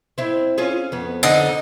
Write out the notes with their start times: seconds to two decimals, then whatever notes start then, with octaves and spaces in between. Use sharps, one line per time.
0.18 C4 E4
0.58 C#4 F4 G#4
0.92 F2 B3
1.23 D3 D#4